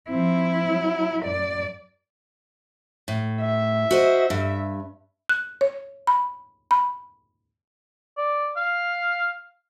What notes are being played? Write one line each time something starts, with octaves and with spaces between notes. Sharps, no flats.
F3 C4 E4
F#3
F#2 D5
A2
E5
F#4 C5 D#5
G2
F#6
C#5
B5
B5
D5
F5